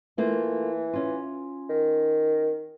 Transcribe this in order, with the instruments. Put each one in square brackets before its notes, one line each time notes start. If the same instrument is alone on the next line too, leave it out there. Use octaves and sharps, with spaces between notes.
[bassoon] E3 [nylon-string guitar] A3 A#3 F4
[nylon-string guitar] C#4 F4
[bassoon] D#3